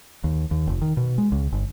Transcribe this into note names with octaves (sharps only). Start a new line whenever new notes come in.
D#2
D#2
F1
D#3
B2
G#3
C#2
G1